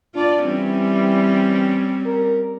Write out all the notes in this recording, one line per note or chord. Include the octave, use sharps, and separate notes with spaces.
D4 F4 D5
E3 G3 C4 C#4
A#4